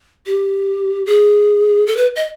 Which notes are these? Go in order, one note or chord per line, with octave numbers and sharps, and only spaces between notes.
G4
G#4
A4
B4
D#5